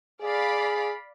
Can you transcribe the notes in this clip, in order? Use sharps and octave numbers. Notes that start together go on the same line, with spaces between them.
G#4 D5 F5 B5